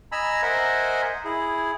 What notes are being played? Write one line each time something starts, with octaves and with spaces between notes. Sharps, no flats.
D#5 G#5 A#5 B5 E6
A#4 C5 D#5 E5 F#5 G#5
E4 G#4